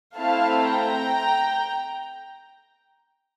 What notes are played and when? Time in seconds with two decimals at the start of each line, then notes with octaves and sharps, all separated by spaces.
0.17 A3 C4 E4 A4 F5 A5
0.69 G5 A#5